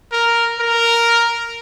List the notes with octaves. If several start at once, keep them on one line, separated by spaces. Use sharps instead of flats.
A#4
A#4